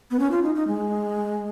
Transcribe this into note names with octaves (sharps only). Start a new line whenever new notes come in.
B3
C#4
F4
D#4
D#4
G#3